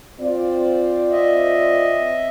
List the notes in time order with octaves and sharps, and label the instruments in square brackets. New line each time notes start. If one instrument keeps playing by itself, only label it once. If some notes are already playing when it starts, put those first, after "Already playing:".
[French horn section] C4 F4 D5
[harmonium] D#5 E5